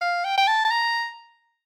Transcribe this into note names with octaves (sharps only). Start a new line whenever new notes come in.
F5
G5
G5
A5
A5
A#5